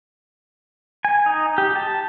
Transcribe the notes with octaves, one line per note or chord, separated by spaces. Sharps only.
G#5
D#4
G4
A5